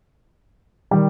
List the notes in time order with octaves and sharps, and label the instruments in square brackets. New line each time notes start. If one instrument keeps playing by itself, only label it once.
[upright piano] D#3 G3